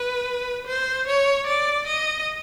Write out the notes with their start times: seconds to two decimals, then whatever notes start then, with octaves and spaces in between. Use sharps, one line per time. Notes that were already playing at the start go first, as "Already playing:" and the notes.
Already playing: B4
0.67 C5
1.07 C#5
1.47 D5
1.87 D#5